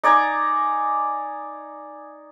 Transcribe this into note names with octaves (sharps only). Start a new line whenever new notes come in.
D#4 D5 G#5 A#5